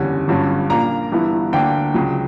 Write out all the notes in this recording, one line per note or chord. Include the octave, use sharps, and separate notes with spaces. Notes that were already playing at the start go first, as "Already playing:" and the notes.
Already playing: F#1 E2 D3 G3 C#4
G1 G2 D3 F#3 C#4
A#1 A#2 A#3 D4 A#5
G1 G2 E3 B3 E4
D2 D3 A#3 D4 G5
C#2 C#3 F#3